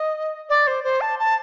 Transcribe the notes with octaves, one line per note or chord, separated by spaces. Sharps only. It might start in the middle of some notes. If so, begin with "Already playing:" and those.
Already playing: D#5
D5
C5
C5
A5
A5